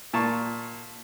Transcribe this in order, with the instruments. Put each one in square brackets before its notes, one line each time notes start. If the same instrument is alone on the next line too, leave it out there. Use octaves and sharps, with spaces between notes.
[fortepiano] A#2 A5 C#6